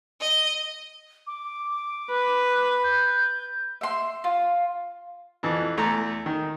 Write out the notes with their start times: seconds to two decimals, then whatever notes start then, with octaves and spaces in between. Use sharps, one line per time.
0.21 D#5
1.27 D6
2.11 B4
2.84 G6
3.81 E5 C6
4.24 F4
5.43 F2 E3
5.78 E2 A3 A#5
6.26 D#3